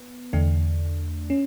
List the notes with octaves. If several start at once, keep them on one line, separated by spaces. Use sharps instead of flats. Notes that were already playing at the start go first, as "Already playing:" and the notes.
Already playing: B3
E2 D3 A3 D4
C#4